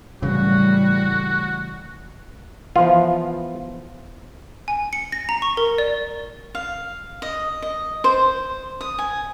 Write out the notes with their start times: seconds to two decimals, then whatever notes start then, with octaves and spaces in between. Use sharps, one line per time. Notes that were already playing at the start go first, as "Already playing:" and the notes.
0.22 A2 C#3 E3 F#3 G3 F#4
2.76 E3 F3 B3 F4
4.68 G#5
4.93 C#7
5.12 A#6
5.29 A#5
5.42 C#6
5.57 A#4
5.78 D5
6.55 F5
7.22 D#5
7.62 D#5
8.04 C5
8.81 D#6
8.99 G#5